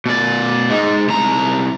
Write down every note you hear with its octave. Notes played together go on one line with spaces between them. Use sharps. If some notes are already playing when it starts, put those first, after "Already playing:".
B2 D5
G#3 D#4
C2 A#5